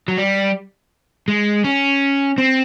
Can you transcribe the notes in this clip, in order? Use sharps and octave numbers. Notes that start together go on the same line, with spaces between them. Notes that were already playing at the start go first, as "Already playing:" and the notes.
F#3
G3
G#3
C#4
C4